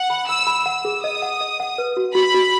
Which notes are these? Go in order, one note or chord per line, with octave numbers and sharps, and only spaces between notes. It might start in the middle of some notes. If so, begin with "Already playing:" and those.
Already playing: F#5
B5
B5 E6
B5
F#5 E6
G#4
D#5 D#6
F#5
D#5
F#5
B4
F#4
F#4 B5
F#4